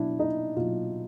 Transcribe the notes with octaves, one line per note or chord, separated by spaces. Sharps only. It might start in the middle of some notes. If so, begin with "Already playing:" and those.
Already playing: B2 F#3 D4 E4
D#4
B2 F#3 F4